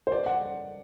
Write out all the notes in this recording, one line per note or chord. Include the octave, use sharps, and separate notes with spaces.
C5
D5
F#5